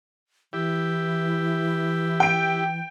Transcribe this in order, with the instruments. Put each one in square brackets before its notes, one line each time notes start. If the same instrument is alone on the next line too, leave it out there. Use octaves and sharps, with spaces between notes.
[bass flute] E3 [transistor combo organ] E4 G4
[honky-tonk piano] G5 D7